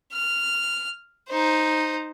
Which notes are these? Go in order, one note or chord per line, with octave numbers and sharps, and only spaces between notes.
F6
D#4 C5